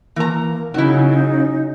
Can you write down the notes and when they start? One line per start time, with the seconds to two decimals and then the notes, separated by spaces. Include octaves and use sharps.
0.16 E3 A#3 A#5
0.74 C#3 F#3 D#4 E4